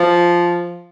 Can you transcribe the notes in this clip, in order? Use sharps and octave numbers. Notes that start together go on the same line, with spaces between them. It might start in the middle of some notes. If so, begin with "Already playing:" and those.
Already playing: F3